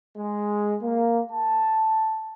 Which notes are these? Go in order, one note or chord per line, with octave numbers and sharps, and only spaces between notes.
G#3
A#3
A5